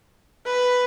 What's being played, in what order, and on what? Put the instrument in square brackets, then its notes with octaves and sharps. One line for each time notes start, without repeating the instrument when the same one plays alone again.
[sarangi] B4